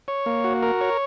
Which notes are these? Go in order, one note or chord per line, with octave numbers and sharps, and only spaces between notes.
C#5
A#3
F#4
A#4
C#5